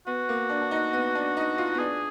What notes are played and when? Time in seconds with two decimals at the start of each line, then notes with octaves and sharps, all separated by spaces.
0.07 B3 F#4
0.29 A#3
0.49 D4
0.62 D4
0.71 D#4
0.93 B3
1.15 D4
1.37 D#4
1.58 F4
1.75 B3
1.79 D4 G#4